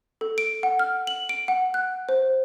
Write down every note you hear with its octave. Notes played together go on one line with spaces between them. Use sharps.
A4
D7
F#5
F6
F#7
D7
F#5
F#6
C5